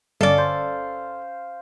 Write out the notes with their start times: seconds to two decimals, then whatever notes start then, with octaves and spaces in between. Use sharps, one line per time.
0.21 G1 C#4 A4 D5 F5
0.38 C5